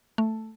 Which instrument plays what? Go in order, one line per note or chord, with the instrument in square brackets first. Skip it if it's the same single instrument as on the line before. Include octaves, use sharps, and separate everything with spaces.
[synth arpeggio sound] A3